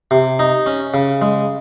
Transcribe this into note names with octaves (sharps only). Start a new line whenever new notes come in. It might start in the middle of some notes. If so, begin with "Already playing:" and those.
C3
D#4
C#4
C#3
G#3